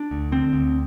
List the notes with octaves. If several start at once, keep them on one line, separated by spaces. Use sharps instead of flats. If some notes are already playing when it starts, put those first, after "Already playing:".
Already playing: D4
D2
D3 C4
D2